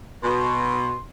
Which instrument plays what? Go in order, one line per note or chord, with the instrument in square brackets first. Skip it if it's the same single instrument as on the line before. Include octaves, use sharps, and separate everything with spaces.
[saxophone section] B2 [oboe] C6